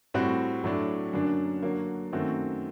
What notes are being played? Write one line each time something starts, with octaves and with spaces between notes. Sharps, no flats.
A2 G3 C4 F#4
A2 F#3 A3 D4
F#2 D3 F#3 A#3 D4
D3 F#3 A#3
F#2 D#3 A3 C4 F#4